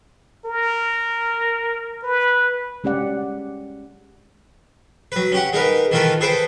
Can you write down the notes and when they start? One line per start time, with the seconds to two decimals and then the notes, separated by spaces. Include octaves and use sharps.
0.46 A#4
2.03 B4
2.84 G#3 C#4 G4 D5 F#5
5.12 F#3 B4
5.32 C#4 G4 F#5
5.53 G#3 D#4 A#4 B4
5.91 D#3 E3 A3 F4 A#4 B4
6.21 G#4 A4 B4 C5 G5